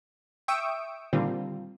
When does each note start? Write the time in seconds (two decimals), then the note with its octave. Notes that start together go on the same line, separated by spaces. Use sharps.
0.48 E5 G5 C#6 D#6 E6 D7
1.13 A#2 D3 D#3 G3 C4 F4